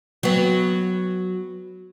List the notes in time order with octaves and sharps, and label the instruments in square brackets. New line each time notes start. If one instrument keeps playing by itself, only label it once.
[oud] F#3 B3